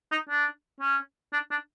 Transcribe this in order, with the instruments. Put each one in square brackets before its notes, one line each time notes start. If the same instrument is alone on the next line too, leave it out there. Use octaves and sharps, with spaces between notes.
[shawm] D#4
D4
C#4
D4
D4